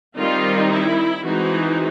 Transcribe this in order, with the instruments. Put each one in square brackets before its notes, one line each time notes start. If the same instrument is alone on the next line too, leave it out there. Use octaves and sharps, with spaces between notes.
[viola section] D#3 G3 C4 D#4 F4
E4
E3 G#3 C4 D#4 F#4